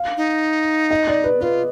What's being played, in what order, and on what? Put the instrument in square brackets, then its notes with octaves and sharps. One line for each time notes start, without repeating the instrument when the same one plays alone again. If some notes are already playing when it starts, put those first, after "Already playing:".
Already playing: [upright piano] F5
[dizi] D#4
[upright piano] D#5
D5
B4
[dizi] F4 [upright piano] B4